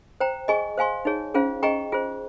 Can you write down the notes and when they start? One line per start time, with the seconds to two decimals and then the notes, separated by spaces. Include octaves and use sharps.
0.20 C5 G5 A#5
0.48 G#4 D#5 G#5 C#6
0.78 C5 F5 G#5 C6
1.05 D#4 G#4 C#5
1.34 C#4 F4 G#4 C5 F5
1.63 G#4 D#5 G5 A#5 C#6
1.92 F4 G#4 C5